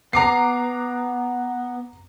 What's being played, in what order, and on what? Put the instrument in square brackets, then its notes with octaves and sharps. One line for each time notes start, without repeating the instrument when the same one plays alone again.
[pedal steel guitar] B3 [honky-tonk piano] A#5 D6 C7